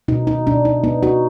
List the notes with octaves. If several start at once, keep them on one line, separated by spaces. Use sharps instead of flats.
B2 D#4
D#4
B2 D4
D#4
B3 D#4
D#4 F#4